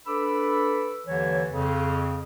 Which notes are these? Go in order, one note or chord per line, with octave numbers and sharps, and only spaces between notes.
D4 A4 B4 B5 D6 E6
D#2 D3 E3 F#3 C#5
F2 C#3